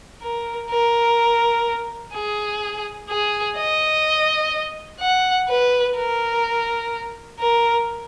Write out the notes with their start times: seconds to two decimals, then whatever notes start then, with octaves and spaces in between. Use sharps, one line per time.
0.22 A#4
0.70 A#4
2.13 G#4
3.10 G#4
3.57 D#5
5.00 F#5
5.49 B4
5.96 A#4
7.40 A#4